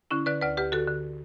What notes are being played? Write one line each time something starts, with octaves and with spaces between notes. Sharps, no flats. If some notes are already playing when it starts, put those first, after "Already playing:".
D3 C#4 E4
D3 B4 D5
D2 B4 D5
D2 G4 B4
D3 F#4 A4
D3